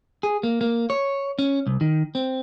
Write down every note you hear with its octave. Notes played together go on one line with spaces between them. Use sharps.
G#4
A#3
A#3
C#5
C#4
C2
D#3
C4